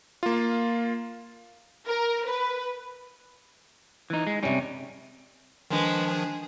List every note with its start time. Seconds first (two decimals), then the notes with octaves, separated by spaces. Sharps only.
0.23 A#3 F4
1.88 A#4
2.28 B4
4.10 E3 D#4
4.27 G#3
4.43 G2 C3 G3 C#4
5.71 D#3 F3 G#3 D4 B4
6.07 G#4